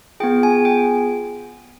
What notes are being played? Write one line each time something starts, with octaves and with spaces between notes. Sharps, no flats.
B3 F4 G#4 G5
G#5
G5